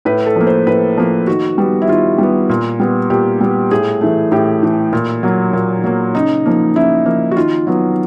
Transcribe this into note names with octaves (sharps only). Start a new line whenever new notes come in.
A2 B4
A4
F3 A#3
C5
A2 B4
F3 A#3
D#3 F#4
G3 B3
E4
D#3 F4
G3 B3
A#2
G3 B3
A#2 G4
G3 B3
A2 G#4
E3 A3
A2 G4
E3 A3
A#2
F#3 A#3
A#2
F#3 A#3
C#3 D#4
F3 A#3
C#3 E4
F3 A#3
F#4
D#3 F4
F#3 B3